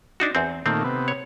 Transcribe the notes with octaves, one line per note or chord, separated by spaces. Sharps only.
D4 D#4 F#4
E2 C4
A#2 D#3 A3 C4
C3 B3
C#5